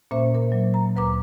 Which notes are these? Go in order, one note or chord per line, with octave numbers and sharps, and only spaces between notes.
A#2 A#3 C#4 C5 E5
A#4
F#3
A#5
D2 B4 A#5 D6